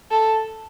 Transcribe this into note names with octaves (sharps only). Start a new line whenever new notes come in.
A4